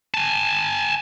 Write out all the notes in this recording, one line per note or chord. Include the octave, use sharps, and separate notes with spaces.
G#5 A5